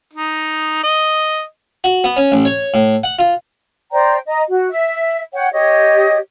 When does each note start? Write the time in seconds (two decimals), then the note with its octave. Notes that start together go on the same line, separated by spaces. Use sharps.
0.13 D#4
0.83 D#5
1.84 F#4
2.04 B3
2.17 C#4
2.32 A1
2.45 C#5
2.74 A2
3.04 F#5
3.19 F4
3.92 C5 D5 G5 A#5
4.27 D#5 A#5
4.49 F#4
4.70 E5
5.34 C#5 F#5 G5
5.53 G4 C#5 D#5